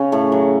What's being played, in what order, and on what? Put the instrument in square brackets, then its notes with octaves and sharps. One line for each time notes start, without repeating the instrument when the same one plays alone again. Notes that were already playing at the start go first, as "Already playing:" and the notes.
Already playing: [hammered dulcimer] C#3 C#4
A2 A3
F#3